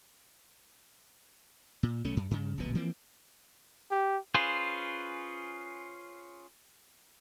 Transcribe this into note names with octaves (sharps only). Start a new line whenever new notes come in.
A#2
B1 A3 C#4
F#2
G2 C#3
D1 A#1 B2 B3
E3 F3 A#3 C4
G4
C#4 F4 G#4 B4 C5